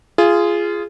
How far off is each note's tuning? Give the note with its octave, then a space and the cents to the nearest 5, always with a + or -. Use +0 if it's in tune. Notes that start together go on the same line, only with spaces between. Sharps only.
F4 -20 G#4 +0